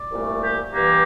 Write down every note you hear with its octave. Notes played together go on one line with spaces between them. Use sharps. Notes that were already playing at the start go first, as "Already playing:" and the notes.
Already playing: D5
C2 A#2 A3
G4
G2 E3 A#3 G4